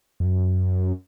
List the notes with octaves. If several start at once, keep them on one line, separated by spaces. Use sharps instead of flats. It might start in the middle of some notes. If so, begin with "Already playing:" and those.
F2
F#2